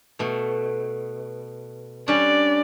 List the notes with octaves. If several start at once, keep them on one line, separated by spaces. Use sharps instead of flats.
B2 A3
G3 C#4 D4 D5